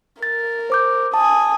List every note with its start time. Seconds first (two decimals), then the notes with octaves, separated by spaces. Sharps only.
0.23 A#4 A6
0.70 C5 D6 G6
1.14 G#5 A5 D#6